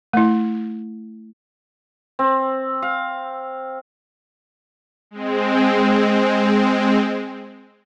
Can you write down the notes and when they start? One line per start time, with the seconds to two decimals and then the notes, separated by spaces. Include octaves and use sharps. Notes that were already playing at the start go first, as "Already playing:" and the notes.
0.13 A3 E4
2.19 C4
2.82 F5
5.11 G#3 C4